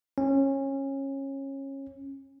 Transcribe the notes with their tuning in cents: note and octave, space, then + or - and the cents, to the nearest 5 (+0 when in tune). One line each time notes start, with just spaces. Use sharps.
C#4 -25